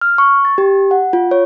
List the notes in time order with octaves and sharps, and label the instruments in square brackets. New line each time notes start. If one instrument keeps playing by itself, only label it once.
[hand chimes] F6
C#6
A6
G4
F#5
F4
C#5